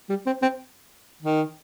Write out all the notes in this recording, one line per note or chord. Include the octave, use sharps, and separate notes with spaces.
G3
C4
C4
D#3